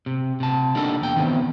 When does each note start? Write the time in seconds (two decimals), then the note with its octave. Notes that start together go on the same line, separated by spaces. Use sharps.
0.06 C3
0.40 C3 A5
0.75 G3 A#3 D4 D#4 A4
1.01 E2 G5
1.16 D#3 B3 C4